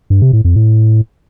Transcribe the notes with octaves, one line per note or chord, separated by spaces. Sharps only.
G2
C3
A2
F2
A2